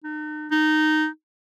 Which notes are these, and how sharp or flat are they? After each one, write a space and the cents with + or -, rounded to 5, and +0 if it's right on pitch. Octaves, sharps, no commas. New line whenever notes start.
D#4 -40
D#4 -10